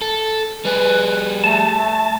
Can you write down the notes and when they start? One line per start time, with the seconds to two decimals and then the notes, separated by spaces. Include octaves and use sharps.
0.01 A4
0.65 G3 G#4 B4
1.44 A3 A5